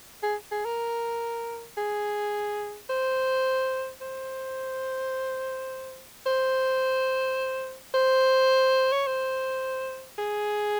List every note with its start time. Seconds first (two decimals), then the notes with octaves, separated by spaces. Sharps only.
0.23 G#4
0.51 G#4
0.65 A#4
1.77 G#4
2.90 C5
4.01 C5
6.26 C5
7.94 C5
8.92 C#5
9.07 C5
10.18 G#4